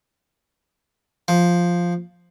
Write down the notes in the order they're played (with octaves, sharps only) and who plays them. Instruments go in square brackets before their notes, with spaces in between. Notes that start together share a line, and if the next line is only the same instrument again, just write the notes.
[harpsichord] F3